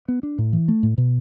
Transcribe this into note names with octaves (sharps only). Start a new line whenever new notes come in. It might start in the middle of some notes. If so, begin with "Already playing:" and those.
B3
D4
A2
E3
A3
A2
B2